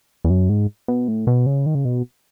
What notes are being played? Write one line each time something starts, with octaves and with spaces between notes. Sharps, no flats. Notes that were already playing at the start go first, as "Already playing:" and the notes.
E2
F#2
G#2
B2
A2
B2
C#3
D#3
C#3
B2